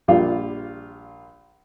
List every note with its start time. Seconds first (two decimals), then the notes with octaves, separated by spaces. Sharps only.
0.08 A#1 G3 F4 F5